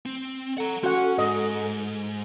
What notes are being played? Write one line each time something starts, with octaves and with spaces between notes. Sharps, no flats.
C4
A4 F#5 A#5
C#4 F#4 F#5
G#2 D#5